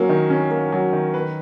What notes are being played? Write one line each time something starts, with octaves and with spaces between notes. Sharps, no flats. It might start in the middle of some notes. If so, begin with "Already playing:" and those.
Already playing: F#3 A#3 C#4
D#3
C#4
A#3
F#3
D#3
B4